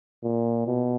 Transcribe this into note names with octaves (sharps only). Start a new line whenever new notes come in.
A#2
B2